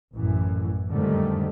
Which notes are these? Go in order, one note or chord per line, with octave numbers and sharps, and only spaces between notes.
A1 F#2 E3
F2 G#2 D3 D#3 G3 A3